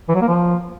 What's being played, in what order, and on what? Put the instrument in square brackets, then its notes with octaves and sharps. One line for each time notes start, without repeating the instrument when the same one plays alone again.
[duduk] E3
F#3
A#3
F3